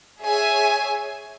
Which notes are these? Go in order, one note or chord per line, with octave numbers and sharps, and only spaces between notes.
G#4 C#5 E5 G#5